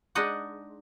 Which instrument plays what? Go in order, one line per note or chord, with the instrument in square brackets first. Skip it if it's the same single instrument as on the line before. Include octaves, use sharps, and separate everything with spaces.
[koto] G#3 D4 D#4 D#5 F#5